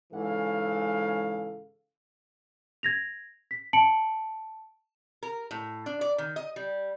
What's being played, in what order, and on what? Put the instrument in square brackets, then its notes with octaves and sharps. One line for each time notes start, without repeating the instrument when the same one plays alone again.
[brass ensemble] G#2 C#3 E3 A4 F5
[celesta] G#6 A#6 F7
B6
A5 C#7 D7 F#7
[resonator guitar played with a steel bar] A#4
A2
D4
D5
D#3
D#5
G3